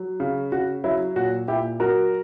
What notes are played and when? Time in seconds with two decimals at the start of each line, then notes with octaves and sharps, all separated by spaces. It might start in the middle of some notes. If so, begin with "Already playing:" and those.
Already playing: F#3
0.20 C#3
0.52 C#3 F#4
0.84 F#3 E4
1.16 A#2 F#4
1.48 A#2 E4 G4
1.80 F#3 F#4 A#4